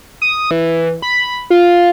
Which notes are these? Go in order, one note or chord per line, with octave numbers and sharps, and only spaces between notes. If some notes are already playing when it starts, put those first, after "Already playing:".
D#6
E3
B5
F4